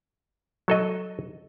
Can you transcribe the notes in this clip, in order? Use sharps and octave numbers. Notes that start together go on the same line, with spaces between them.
F#3 A4 D#5